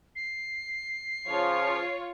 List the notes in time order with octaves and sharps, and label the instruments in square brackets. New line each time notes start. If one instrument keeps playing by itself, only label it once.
[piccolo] C7
[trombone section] C#3 F3 [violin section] F4 C#5